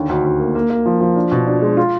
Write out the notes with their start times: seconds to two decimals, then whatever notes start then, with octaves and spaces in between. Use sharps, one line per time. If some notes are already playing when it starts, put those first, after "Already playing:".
Already playing: D#2 D3
0.09 D2
0.24 D2
0.40 A#3
0.55 A#3
0.70 A#3
0.86 F3
1.01 F3
1.16 D4
1.32 B2
1.47 D4
1.62 G#3
1.77 F4